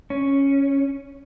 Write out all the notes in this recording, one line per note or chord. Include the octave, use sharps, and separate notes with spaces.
C#4